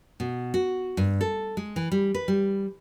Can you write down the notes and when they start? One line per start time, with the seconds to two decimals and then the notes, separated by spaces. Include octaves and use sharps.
0.20 B2
0.54 F#4
0.97 G2
1.21 A4
1.57 G#3
1.76 E3
1.92 G3
2.14 B4
2.28 G3